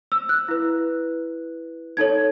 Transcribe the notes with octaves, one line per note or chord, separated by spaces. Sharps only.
E6
F#6
E4 B4
D#4 A4 C#5 G#6